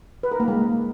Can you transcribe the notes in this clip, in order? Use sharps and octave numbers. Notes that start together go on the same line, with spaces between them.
B4
A#4
A#3
G#3